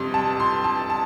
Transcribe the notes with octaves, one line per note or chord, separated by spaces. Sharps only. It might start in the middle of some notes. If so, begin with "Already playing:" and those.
Already playing: F2 C3 G3 C6
A5
C6
A5
A5